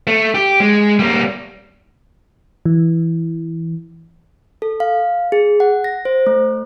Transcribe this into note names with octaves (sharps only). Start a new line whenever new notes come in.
A3
G4
G#3
G3 A#3
E3
A4
F5
G#4
F#5
A#6
C5
A3